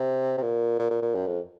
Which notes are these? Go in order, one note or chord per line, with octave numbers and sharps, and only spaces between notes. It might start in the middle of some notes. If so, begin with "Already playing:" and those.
Already playing: C3
C3
A#2
A#2
A#2
A#2
F#2
F2